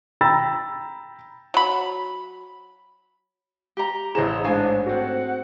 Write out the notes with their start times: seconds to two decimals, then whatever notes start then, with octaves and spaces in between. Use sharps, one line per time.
0.21 G5 A#5 B5 E6 A6
1.54 F#3 B5
3.77 G4 A#5
4.15 A1 E4 G#4 C5 C#5 D#5 A#5 E7
4.44 G#2 A3 D4 D#4 C#5 F5 G#5
4.86 C4 F#4 F#5